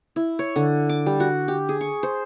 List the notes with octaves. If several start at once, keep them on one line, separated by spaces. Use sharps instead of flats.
E4
C#5
D3
D6
G3
F#4
G4
G#4
C#6
C5